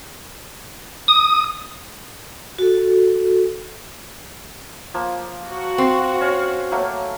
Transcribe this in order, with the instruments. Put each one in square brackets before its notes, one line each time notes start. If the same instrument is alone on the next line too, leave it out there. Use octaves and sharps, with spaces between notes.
[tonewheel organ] D#6
[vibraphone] F#4 A4
[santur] F3 A#3 A5
[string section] F#4
[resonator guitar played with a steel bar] C4
[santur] C#4 F5
F#3 A3 A#3